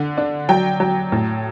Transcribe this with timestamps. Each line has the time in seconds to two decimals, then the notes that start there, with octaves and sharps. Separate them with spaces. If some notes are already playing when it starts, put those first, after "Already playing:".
Already playing: D3
0.18 D4
0.49 F#3 G5
0.80 F#3
1.12 A2